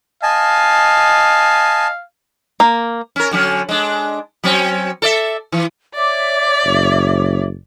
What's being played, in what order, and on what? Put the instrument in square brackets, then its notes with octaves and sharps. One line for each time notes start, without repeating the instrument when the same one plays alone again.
[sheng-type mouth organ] D#5 G#5 A5 [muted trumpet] F5
[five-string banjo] A#3
[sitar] C#4 A#4
D3 F#3 C#4
G#3 D4
F#3 C4 C#4
A4 D5 E5
E3
[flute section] C#5 E5 D6 [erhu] D5
[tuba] F#1